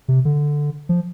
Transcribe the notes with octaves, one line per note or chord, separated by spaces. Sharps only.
C3
D3
F3